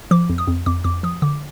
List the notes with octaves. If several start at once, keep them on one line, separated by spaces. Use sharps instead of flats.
F3 D6
F2
D#6
F2
F2 D6
F2 D6
F3 D#6
D3 D6